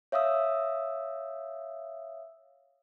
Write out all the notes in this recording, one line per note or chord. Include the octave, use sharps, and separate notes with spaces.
C#5 E5 F5 D#6 E6